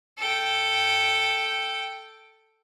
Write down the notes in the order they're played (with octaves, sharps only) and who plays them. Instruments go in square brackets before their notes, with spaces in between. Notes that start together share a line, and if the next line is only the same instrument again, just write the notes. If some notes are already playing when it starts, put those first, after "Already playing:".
[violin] A4 G5